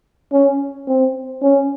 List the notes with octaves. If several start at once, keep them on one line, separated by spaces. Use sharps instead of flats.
C#4
C4
C#4